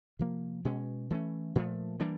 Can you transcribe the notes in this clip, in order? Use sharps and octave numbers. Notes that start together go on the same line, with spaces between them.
C3 F3 A#3
B2 G#3 C#4
E3 A3 C#4
A#2 F3 A3
E3 G3 A#3 D4